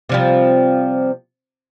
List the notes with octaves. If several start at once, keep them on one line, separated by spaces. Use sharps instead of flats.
C3 F3 G3